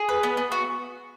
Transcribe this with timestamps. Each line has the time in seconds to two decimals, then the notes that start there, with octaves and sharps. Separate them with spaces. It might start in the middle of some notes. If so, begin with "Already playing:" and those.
Already playing: G#4
0.09 B4
0.23 B3
0.37 B3
0.52 F#4